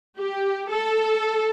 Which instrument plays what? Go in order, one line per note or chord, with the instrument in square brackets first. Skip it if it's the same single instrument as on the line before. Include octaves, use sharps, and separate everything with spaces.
[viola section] G4
A4